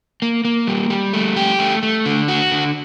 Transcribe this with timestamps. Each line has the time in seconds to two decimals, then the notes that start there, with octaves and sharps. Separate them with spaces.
0.22 A#3
0.45 A#3
0.67 G3
0.90 G3
1.13 A3
1.36 G4
1.59 A3
1.83 A3
2.05 D3
2.28 F#4
2.51 D3